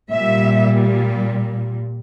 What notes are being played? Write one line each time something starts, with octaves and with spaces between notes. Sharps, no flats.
A#2 G3 E5